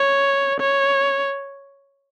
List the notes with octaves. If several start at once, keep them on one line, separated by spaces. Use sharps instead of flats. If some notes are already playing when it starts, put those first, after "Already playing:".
Already playing: C#5
C#5